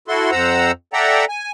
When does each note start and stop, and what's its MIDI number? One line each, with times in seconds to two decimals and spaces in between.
0.08 0.31 64
0.08 0.31 66
0.08 0.31 69
0.08 0.31 84
0.31 0.71 41
0.31 0.71 72
0.31 0.71 78
0.31 0.71 82
0.31 0.71 88
0.93 1.25 69
0.93 1.25 74
0.93 1.25 76
0.93 1.25 78
0.93 1.25 79
0.93 1.25 82
1.29 1.52 80